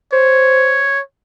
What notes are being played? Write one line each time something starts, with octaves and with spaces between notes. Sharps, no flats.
C5 C#5